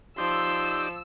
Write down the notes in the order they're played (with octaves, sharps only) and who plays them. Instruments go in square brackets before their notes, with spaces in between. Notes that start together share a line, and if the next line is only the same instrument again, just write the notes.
[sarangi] F3 [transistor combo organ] D#4 G4 D5 [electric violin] C6 [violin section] E6